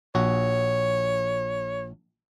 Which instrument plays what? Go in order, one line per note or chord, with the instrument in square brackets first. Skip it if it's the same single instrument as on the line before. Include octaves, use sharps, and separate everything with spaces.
[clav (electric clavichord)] A#1 F#4 [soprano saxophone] C#5